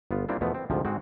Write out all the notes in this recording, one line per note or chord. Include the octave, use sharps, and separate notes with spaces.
G1 B3 F4
G3 A#3 C4 D4 E4 F4
E2 B2 F3 A3 B3
C4
D2 G#2 C3 F3
G#2 G#3 C4 F#4